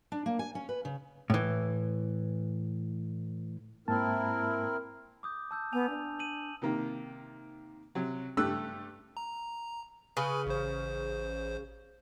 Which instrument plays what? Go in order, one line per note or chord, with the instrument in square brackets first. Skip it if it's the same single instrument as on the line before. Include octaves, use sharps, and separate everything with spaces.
[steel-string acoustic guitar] D4
A#3
G#5
C#4
B4
C#3
[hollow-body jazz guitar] A2 E3
[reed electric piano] G#2 A#3 A5 [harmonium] C4 E4 A#4
[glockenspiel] D6 D#6 G6
A5 E6 G6
[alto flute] B3 [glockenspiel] G#5 F7
[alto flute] D4
[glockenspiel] D#7 F#7
[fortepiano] C3 D#3 A#3
C3 F#3
G2 A3 G4 E6 F#6
[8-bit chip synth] A#5
[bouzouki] C#3 [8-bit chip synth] B4 G#5 B5
[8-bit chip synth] A1 C5